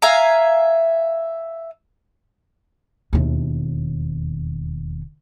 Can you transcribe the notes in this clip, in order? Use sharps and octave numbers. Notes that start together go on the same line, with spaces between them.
E5 F5 G#5 A#5
E1 D#2